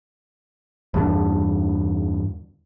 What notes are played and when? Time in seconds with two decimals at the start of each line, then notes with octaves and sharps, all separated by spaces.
0.94 E2 G2 D3